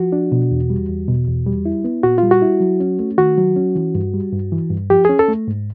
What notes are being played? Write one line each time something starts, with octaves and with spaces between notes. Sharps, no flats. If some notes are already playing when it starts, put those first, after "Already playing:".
Already playing: F3 F#4
D4
B2
E2
G3
E2
B2
E2
G3
E4
B3
A#2 F#4
G3 F4
F#4
E4
F#3
C#4
A3
D#3 F#4
F#3
C#4
E3
G2
G3
G2
E3
G2
F3 G4
C#4 G#4
A4
A3
G#2